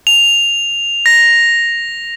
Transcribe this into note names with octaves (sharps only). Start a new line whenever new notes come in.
F7
A#6